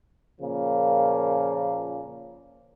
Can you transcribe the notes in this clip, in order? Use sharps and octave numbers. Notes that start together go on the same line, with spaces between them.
A#2 C#3 F3 A#3